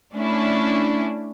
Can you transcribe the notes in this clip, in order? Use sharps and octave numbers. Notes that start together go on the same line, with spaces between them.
A3 C#4 D4 E4